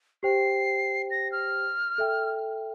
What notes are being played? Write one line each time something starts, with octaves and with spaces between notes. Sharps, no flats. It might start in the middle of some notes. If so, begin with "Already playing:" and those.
G4 C5 G5 C7
A#6
F6
A4 E5 G5